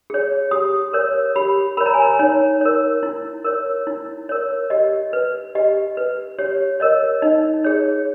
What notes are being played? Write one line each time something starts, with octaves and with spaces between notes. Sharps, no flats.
G#4 C#5
G4 D#6
A#4 C#5
G4 B5
A#4 C#5 B5
A#5
G#5
A#5
D#4 C#5
A#4 C#5
E4
A#4 C#5
E4
A#4 C#5
G4 D#5
B4
G4 D#5
B4
G4 C#5
A#4 C#5 D#5
D#4 D#5
G#4 C#5